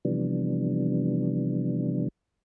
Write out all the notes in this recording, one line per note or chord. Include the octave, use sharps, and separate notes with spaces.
C3 E3 F3 G3 B3 D4